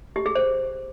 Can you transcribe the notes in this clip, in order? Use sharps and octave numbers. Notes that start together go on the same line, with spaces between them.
G4
G#4
C5